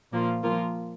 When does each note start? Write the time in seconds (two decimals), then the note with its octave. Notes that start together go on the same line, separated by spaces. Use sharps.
0.12 A#2 F3 A#3 F4
0.43 F3 A#3 F4 A#4